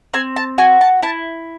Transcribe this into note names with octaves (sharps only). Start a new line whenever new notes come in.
C4 G#5
A5
F#4 G#5
A5
E4 A5